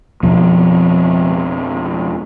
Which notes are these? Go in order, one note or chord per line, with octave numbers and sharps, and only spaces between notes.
F2 B2 F3